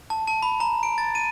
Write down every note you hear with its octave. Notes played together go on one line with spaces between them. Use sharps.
A5
A5
B5
A#5
D7
A6
D#7